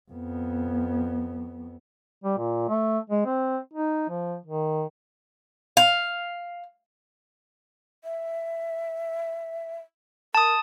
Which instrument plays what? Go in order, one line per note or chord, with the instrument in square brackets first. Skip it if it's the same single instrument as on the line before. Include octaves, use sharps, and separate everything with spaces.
[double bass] F2 B3
[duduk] G3
A#2
A3
G#3
C4
D#4
F3
D#3
[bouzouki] F5
[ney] E5
[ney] A#4 [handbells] A5 D#6